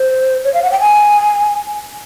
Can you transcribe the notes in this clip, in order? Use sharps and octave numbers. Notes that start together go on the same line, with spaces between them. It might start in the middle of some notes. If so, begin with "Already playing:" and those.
Already playing: C5
C#5
F5
F#5
G5
G#5